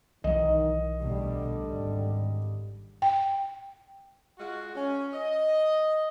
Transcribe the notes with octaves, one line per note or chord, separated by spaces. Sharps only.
B1 D#3 E3 F#3 D#5
D2 B2 D3 G3
G#1
G5
G#3 F4 F#4
C#4
D#5